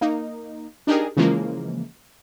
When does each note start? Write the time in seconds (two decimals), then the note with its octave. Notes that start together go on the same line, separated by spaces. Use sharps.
0.01 A#3 D#4
0.87 D4 D#4 G4 G#4 A#4
1.17 C#3 E3 F3 G#3 A#3